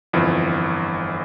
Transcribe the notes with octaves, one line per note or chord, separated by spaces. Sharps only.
G1 F2 E3